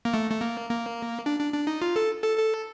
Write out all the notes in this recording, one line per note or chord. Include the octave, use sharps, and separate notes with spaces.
A#3
A3
A3
A#3
A#3
D4
D4
D4
D#4
F4
A4
A4
A4